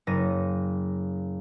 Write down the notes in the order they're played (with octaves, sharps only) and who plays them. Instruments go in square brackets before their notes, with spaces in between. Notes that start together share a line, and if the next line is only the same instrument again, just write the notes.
[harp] F#1 A#6 D#7